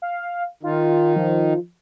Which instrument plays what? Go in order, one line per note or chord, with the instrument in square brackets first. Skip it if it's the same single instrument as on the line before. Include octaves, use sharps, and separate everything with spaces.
[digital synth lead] F5
[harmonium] D#3 D#4 [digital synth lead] F4
[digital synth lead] F3